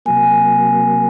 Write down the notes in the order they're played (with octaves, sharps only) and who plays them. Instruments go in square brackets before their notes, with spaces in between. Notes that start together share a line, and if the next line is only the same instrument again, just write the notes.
[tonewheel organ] C3 F#3 A#3 [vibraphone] G#5